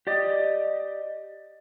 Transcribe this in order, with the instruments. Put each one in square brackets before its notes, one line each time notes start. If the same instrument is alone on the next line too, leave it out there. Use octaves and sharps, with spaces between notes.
[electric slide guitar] G4 D5 D#5